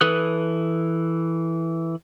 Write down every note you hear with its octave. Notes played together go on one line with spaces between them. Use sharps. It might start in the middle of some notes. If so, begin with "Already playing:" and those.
E3 A4 B4 D#6 F#6